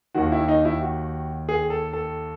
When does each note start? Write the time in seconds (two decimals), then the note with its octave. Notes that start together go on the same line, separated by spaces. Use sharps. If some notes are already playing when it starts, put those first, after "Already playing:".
0.15 D#2 D#3 F#4
0.32 E4
0.48 D#4
0.65 E4
0.82 F#4
1.49 G#4
1.70 A4
1.93 A4